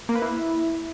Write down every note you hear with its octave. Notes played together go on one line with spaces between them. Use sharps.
A#3
B4
E4